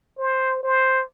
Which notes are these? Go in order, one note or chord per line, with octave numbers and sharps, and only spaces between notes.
C5
C5